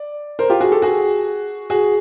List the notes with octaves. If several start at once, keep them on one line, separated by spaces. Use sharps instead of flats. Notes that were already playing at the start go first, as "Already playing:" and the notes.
Already playing: D5
A#4 C5
F4 G4
F#4 G#4
G4 A4
F#4 G#4
F#4 G#4